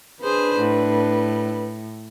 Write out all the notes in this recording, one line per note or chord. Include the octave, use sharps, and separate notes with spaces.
D4 G#4 B4 C5
A2